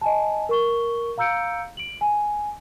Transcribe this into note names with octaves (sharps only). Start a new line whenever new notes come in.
D#5 G#5 A5
A#4 C#6 G7
F5 A#5 E6 G6 C#7 D7
D7 F#7
G#5